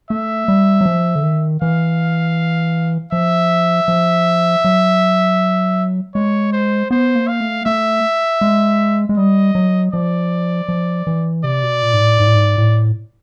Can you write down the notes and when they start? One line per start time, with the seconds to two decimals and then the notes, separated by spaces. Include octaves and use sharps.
0.10 A3 E5
0.48 G3
0.81 F#3
0.86 F3
1.15 D3
1.23 D#3
1.62 E3 F5
3.12 F3 E5
3.88 F3
4.64 F#3
6.15 G#3 C#5
6.53 C5
6.91 B3 C5
7.15 A#3
7.28 F5
7.40 A3
7.66 A3 E5
8.41 G#3
9.09 G#3
9.17 G3 D#5
9.55 F#3
9.93 F3 D5
10.68 F3
11.07 E3
11.44 C3 D5
11.63 B2
11.83 A#2
11.93 G#2
12.01 A2
12.19 G#2
12.27 A2
12.35 G#2
12.58 A2